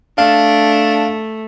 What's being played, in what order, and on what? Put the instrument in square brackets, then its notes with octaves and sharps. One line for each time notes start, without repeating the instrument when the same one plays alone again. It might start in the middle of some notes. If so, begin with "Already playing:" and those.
[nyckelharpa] A3 [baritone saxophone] D4 [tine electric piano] F5